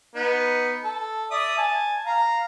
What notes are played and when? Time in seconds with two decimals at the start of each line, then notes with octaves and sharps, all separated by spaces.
0.16 B3 D#4
0.84 A4
1.31 D5 E5 D#6
1.57 G#5 A5
2.06 F5 A#5